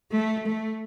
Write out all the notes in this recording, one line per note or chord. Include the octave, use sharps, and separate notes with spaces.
A3
A3